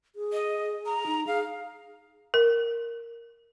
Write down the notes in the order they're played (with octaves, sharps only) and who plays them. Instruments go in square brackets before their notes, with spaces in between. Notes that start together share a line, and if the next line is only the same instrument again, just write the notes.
[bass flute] G#4
[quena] D#5
A#5
[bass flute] D#4
[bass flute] G#4 [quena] F5
[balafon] A#4